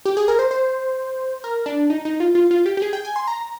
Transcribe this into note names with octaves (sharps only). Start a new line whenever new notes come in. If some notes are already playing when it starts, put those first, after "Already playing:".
G4
G#4
A#4
C5
C5
A#4
D4
D#4
D#4
F4
F4
F4
G4
G4
G#4
G5
G#5
C6
A#5